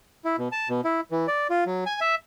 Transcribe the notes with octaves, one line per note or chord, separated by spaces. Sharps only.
E4
B2
A5
B2
E4
E3
D5
F4
F#3
G#5
E5